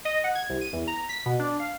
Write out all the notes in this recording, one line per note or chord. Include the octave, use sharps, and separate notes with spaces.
D#5
F#5
G#6
C2
D#7
E2
A#5
B6
B2
D4
F5